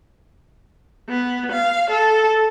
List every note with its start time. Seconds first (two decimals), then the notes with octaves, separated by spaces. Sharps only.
1.09 B3
1.52 F5
1.90 A4